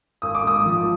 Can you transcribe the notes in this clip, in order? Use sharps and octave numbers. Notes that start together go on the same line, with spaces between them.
G#1 D#6
D6
G#2 D#6
F3